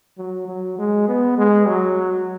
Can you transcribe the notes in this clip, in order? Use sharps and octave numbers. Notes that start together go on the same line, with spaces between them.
F#3
F#3
G#3
B3
G#3
F#3